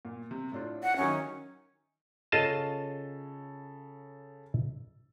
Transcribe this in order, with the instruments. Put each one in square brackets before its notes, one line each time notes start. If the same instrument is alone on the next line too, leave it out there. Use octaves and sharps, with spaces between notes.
[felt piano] A#2
C3
A2 D4 F4
[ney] F#5
[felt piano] D#3 F#3 E5 [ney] C#4
[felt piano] C#3 A4 C#5 [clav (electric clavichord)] F4 D#5 A5